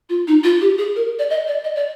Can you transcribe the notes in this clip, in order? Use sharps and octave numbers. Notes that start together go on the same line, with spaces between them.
F4
D#4
F4
G4
G#4
A#4
D5
D#5
D5
D#5
D5